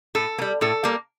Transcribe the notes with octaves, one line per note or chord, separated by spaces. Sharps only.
A2 A4
A#3
G3
A2 A4
G3 A#3